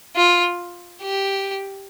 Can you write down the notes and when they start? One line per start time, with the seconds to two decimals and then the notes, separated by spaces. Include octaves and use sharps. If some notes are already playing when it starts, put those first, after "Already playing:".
0.16 F4
1.02 G4